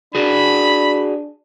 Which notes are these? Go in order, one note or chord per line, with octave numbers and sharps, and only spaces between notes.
D4 F#4 G#4 B5